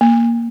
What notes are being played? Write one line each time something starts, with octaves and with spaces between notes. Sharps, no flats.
A#3